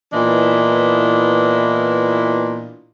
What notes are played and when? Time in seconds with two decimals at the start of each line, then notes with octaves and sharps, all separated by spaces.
0.13 A#2 E3 B3 D4 E4 D#5